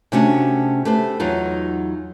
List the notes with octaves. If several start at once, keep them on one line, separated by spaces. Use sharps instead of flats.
C3 A3 C#4 D4 F#4
A3 G4 B4 C5
E2 F#3 D#4 F4